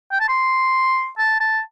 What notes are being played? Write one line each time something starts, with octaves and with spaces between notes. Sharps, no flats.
G5
A5
C6
A5
A5